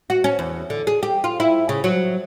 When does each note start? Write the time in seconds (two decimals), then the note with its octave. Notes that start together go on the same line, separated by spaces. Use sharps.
0.10 F#4
0.24 C#4
0.39 E2
0.70 D3
0.87 G#4
1.03 G4
1.24 F4
1.40 E4
1.69 C#3
1.84 F#3